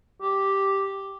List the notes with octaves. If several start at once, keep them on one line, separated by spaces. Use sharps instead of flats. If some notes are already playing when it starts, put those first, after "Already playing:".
G4